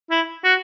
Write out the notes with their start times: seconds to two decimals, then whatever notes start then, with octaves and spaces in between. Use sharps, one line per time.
0.11 E4
0.44 F#4